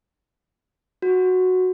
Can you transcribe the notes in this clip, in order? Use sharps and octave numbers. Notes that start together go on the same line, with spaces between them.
F#4